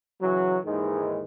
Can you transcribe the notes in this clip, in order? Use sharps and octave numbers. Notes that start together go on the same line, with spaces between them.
C#3 E3 F#3
D#2 G#2 D#3 E3 G#3